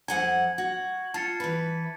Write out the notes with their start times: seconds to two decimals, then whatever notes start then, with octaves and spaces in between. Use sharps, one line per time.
0.08 F2 F#5 G#5 G#6
0.58 F#4
1.14 F4 A5 A6 C#7
1.40 E3 B4